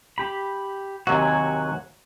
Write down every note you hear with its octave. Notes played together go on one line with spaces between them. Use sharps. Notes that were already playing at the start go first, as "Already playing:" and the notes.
G4 B5
D#2 C3 F#3 F#4 G#5